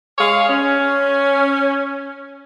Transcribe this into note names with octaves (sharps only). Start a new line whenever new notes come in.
G#3 G#4 C#5 F5
C#4